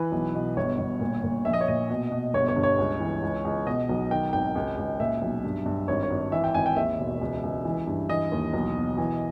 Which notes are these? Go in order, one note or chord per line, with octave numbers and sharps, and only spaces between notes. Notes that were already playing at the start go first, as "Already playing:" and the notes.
Already playing: E3 B4
B1
B2
G1 C#5
G1
A#2
A#2
A#1 E5
D#5
C#5
A#2 D#5
B2
B2
G1 C#5
C#5
G2
C#5
C#2
E3
C#2
C#2
B2 D#5
B1
D#3 G5
G#1 G5
C#2
C#2
A#2 E5
B1
G2
G2
G#1 C#5
C#5
G#1
E3 E5
G5
G#1 G#5
G5
D#2 E5
E1
C#2
C#2
E3
G2
E3 D#5
D#2
B1
B2
E3